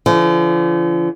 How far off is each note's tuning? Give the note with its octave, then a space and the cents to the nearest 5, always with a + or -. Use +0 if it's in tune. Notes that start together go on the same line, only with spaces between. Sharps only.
D3 -35 F3 -40